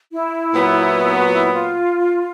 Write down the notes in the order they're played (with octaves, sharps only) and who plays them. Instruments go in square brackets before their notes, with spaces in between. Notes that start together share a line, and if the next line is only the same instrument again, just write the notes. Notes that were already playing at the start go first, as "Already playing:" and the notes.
[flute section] E4
[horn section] A#2 F#3 B3
[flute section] F#4
F4
E4
F4